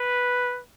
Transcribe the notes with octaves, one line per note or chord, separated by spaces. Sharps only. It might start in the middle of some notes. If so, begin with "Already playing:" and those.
Already playing: B4